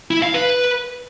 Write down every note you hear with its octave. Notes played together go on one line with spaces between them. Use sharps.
E4
F5
B4